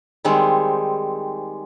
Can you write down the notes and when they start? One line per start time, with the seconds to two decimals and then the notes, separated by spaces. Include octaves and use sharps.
0.25 D#3 G3 G#3 C4